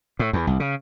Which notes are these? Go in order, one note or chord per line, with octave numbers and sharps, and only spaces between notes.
A2
E2
C2
C#3